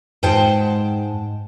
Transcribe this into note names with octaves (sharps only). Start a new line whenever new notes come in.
G#2 G#3 C5 F#5 G5 A5